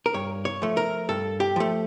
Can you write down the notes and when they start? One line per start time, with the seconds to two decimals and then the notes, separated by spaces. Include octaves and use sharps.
0.06 A#4
0.14 G2 C#5
0.45 C#5
0.62 F3 A3
0.77 A#4
1.09 G2 A4
1.40 G4
1.56 F3 A3